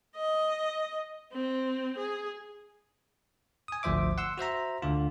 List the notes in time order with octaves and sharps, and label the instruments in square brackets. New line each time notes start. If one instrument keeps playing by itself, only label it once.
[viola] D#5
C4
G#4
[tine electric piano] G#5 D#6
G#1 D2 F3 C5 E5 D6
F#5 C6 E6
F#4 C5 E5 A#5
D2 D3 F4